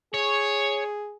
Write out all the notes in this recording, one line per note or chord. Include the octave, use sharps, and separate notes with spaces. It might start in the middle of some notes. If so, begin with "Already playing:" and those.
G#4 C#5